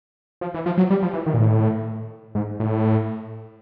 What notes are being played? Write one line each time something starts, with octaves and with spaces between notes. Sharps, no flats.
F3
E3
F3
F#3
G3
F3
E3
D#3
A#2
A2
G#2
A2